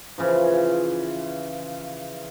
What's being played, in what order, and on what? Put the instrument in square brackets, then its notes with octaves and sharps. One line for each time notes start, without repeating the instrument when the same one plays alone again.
[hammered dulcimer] C#3 E3 F3